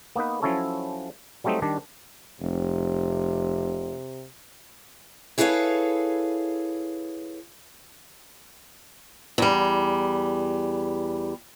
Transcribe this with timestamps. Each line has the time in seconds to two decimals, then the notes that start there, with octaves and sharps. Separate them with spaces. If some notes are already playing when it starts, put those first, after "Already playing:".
0.16 A#3 B3 D#4 B4
0.42 F3 F#3 C#4 E4 A4 C#5
1.44 F#3 G3 A3 C4 D#4
1.62 D#3 G3 D4
2.41 F1 C3
5.38 E4 G#4 A4 B4 C#5 F5
9.38 E2 G3